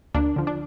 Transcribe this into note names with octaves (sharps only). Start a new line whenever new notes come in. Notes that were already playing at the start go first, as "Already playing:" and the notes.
D2 A#3 D4
D3 F3
D4